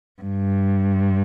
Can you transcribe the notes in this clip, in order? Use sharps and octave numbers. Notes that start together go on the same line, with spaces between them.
G2